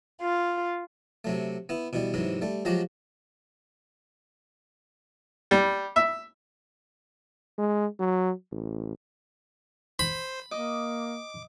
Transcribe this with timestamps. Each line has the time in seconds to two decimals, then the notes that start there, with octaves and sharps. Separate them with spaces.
0.20 F4
1.25 C3 F#3 A3
1.69 B3 E4
1.93 B2 E3 G3
2.14 G#2 C3 E3 F#3
2.42 G3 A3
2.65 F3 F#3 G#3 F#4 G4
5.51 G3
5.96 E5
7.58 G#3
8.00 F#3
8.52 A1
9.99 C5 B5
10.51 A#3 D#5 D6